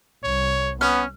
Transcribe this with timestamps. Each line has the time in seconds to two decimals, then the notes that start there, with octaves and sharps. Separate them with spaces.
0.24 C2 C#5
0.81 B3 C#4 F6